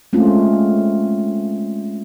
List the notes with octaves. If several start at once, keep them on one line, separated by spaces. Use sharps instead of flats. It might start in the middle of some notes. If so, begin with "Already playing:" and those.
G#3 A3 C4 C#4 F4